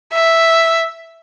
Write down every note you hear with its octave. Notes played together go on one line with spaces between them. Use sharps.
E5